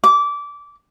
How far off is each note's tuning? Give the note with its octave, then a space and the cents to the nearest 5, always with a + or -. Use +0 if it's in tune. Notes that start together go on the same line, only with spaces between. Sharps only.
D6 -20